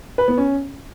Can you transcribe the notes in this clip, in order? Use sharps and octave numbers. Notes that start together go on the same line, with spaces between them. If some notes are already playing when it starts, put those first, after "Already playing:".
B4
B3
C#4